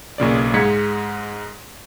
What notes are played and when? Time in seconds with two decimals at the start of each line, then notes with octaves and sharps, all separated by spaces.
0.18 B1 A#2 C#3 D5
0.54 G#2 G#3 G#6 B6 C#7